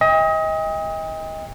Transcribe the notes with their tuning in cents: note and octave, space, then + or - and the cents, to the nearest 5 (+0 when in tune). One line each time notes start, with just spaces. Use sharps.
D#5 +30 G5 +40